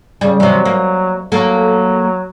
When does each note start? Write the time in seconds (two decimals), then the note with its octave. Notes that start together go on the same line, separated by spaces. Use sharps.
0.21 C#3 G3
0.40 C3 E3 F#3
0.65 A#3
1.32 F#3 A#3 A4